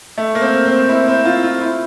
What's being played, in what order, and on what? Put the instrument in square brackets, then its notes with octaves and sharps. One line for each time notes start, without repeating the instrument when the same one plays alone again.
[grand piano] A3
A#3
C4
C4
E4
C4
F4
F4
E4